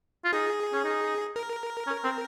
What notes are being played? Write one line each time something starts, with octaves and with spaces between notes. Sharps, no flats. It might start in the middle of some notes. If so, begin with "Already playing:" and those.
F4
D#4 G#4
C#4
D#4
A#4
C#4
C4